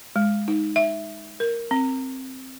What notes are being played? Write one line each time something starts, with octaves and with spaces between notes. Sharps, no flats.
G#3
D#4
E5
A#4
C4